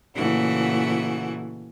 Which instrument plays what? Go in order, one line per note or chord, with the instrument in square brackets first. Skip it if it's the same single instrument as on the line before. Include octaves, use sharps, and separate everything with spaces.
[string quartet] A#2 C#3 E3 A3 F#4 F#5